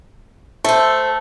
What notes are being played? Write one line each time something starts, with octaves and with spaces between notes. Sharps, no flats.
A3 A4 C5